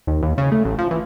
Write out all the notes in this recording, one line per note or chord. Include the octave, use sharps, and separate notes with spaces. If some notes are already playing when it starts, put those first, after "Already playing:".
D#2
D#2
C#3
A3
A1
F3
E3